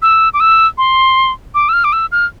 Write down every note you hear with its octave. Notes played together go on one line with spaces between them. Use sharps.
E6
D6
E6
C6
D6
E6
F6
D6
E6
F6